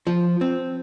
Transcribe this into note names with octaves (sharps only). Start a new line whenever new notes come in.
F3
C4